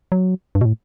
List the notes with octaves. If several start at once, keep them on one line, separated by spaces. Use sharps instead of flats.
F#3
G2
B2
A2